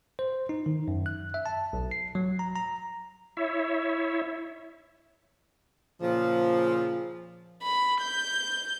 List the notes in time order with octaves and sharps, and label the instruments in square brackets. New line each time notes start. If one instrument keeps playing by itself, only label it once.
[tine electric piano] C5
D#4
D#3
F#2
F#6
E5
A5
B1
C7
F#3
A#5
A#5
[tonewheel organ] E4 C#5 E5
[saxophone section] A#2 C#3 F3
[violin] B5
G6